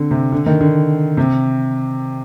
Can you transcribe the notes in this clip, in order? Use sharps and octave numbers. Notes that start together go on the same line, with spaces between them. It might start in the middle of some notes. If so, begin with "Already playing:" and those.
Already playing: D3 C4
C3
D3
D#3
D3
C3